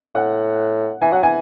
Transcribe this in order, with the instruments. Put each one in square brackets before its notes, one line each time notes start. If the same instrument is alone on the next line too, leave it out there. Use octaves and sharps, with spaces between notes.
[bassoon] A2 [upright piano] F#5
[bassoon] E3 [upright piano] G#5
[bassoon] F#3 [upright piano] F#5
[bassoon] E3 [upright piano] G#5